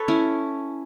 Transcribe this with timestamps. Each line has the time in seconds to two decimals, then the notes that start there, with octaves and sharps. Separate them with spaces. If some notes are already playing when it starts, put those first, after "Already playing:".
Already playing: A4 B4 C#5
0.08 C#4 E4